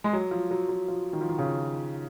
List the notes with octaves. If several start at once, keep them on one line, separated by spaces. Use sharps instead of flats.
G#3
F#3
F3
F#3
F#3
F3
D#3
F3
D#3
C#3